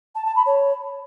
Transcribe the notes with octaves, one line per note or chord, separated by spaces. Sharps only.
A5
A5
B5
C#5